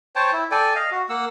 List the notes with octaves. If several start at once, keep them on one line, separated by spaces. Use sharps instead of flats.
C5 C#5 G5 A5
E4
A4 D5 G5 G#5
D#5 F5
F#4
A#3 F#5 E6